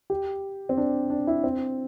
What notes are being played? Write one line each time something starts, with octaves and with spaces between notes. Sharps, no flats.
G4
C4
D4
D4
E4
C4